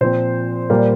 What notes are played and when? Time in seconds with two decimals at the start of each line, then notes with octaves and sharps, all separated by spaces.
0.01 A#2 F3 C4 C5
0.70 A#2 G3 A#3